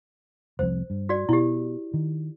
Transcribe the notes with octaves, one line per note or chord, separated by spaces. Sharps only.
F1 C2 F2 C5
G2
F#4 D5
B2 E4 G4
D#3